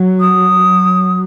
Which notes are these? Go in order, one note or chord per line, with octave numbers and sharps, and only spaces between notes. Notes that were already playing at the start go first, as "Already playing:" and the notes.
Already playing: F#3
D#6